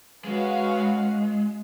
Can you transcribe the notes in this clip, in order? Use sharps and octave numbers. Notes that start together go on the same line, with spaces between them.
G#3 C#4 F#4 B4 F5